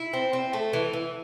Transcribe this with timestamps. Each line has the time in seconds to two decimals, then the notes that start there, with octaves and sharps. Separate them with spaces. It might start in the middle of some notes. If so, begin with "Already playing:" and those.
Already playing: E4
0.13 C4
0.33 C4
0.53 A3
0.73 E3
0.93 E3